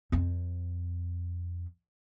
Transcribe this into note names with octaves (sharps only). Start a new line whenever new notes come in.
F2 C4